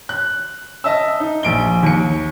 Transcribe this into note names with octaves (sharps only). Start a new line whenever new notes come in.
F#6
D#5 E5 A5 E6
D#4
A#1 D7 G7
D#2 C#7